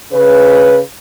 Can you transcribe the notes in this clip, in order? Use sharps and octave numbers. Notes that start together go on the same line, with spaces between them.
C#3 B4